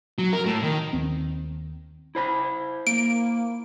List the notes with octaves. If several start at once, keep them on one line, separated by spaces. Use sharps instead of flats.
F#3
A#4
A2
D#3
D#2 C4
E4 C5 B5
A#3 D7